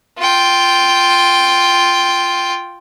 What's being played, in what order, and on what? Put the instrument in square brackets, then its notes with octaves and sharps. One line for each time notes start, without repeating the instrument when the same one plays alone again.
[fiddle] F4 G5